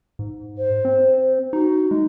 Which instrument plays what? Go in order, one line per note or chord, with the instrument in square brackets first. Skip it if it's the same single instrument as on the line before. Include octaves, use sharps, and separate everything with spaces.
[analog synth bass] G#2
[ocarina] C5
[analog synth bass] C4
[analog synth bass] D#4 [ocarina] F#4
[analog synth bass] G#3 [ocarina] D#4